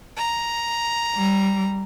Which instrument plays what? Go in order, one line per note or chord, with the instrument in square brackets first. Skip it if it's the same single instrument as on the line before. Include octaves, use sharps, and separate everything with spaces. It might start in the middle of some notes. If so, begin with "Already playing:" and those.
[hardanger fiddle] A#5
[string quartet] G3